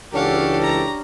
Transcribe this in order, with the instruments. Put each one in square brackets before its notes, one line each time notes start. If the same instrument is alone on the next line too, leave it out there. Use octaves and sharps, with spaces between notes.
[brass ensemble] C#2 E3 A4 [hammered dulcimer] C#4 D4 [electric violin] G4 [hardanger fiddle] F5 F#5
[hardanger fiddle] A#5